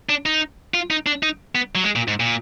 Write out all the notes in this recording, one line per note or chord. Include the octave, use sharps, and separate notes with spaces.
D4
D#4
F4
D#4
D4
D#4
B3
F#3
G#3
A#2
G#2
A#2